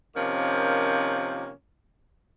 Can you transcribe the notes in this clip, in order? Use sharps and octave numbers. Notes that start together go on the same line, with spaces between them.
C3 D#3 F3 A#3 C#4